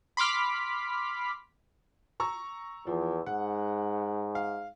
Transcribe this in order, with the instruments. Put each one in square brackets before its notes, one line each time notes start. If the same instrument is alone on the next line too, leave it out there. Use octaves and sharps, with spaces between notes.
[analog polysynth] B5 C6 D6 F6 B6
[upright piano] A#5 C#6 E6
[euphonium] E2 [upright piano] F3
[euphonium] G#2 [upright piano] F#5
[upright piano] F5